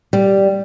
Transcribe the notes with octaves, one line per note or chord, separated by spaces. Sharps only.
G3